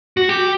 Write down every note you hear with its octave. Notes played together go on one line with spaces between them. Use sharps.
F#4
G4